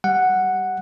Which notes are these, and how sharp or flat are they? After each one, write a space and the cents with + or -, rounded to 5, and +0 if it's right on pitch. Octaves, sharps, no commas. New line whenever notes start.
G3 +0 F#5 +0